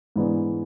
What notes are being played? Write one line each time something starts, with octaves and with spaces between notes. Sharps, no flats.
G#2 E3 B3 D4